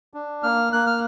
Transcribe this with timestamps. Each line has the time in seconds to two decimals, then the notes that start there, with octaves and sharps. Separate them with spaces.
0.14 D4
0.43 A#3 F6
0.73 A#3 F#6
0.87 F6